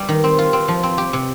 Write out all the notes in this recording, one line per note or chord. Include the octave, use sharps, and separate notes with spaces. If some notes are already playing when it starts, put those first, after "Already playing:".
Already playing: G3
D#3
C4
F4
C4
F3
C4
G4
C3